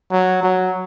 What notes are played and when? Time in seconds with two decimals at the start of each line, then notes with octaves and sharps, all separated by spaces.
0.11 F#3
0.43 F#3